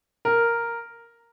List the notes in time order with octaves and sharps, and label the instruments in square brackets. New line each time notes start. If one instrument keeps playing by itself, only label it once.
[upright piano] A#4